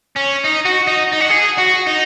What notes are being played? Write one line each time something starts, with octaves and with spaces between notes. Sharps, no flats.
C#4
D#4
F#4
D#4
D#4
F#4
G#4
F#4
D#4